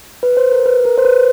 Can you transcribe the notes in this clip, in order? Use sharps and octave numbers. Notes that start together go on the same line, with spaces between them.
B4
C5
A#4
B4
A#4
C5
B4